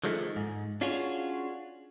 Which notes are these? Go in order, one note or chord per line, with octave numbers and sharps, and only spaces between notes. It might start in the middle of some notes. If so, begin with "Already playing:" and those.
D3 D#3 F3 G#3 A3
G#2
C#4 D4 F4 F#4 G#4 C#5